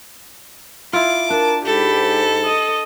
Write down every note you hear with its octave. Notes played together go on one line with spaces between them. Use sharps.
E4 F4 D6
D4 A#4 A5
G#2 G4 A4 B5
D#5